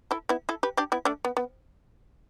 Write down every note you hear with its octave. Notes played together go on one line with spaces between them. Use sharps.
E4 A4
B3 E4
E4 A4
G4 B4
D4 G4
B3 E4
A3 D4
B3
B3